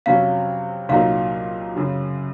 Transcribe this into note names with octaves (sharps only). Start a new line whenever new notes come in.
F2 C3 F#3 C#4 F5
C2 A#2 F#3 A#3 D#4 F5
F#2 C#3 F#3